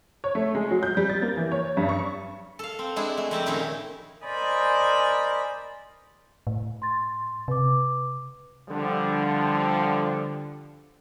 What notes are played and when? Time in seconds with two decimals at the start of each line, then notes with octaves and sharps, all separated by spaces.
0.24 C#5
0.35 A3
0.55 G#3
0.71 F#3
0.83 G6
0.97 G3
1.10 A6
1.22 A#3
1.37 E3
1.52 C#5
1.77 G2
1.89 C#6
2.59 A4 F5
2.79 C4
2.96 G#3 D4 E4 G#4
3.17 A3
3.31 F2 C4 G4 A5
3.46 A#2 D#3 C#4 D#4 E4
4.24 A#4 C5 D5 D#5 G#5 B5
6.47 A2
6.82 C6 A6
7.48 C3 B4 D6
8.70 D3 F3 G3